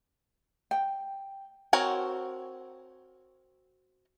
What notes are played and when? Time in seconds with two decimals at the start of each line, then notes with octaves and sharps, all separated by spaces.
0.71 G5
1.73 C4 F#4 A#4 C#5 G#5